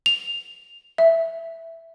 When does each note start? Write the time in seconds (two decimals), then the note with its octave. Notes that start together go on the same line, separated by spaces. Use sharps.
0.06 F7
0.98 E5